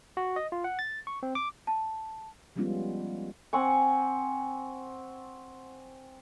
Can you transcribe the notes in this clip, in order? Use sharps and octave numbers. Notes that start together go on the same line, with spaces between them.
F#4
D#5
F4
F#5
A6
C#6
C4
D6
A5
F3 G3 G#3 B3 C#4 F4
C4 F#5 G#5 C#6